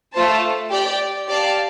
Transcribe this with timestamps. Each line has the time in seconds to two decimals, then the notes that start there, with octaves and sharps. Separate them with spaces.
0.14 A3 F4 C5 A5
0.70 G4 D5 G5
1.27 G4 D5 F5 A5